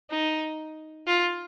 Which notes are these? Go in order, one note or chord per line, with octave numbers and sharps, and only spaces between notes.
D#4
F4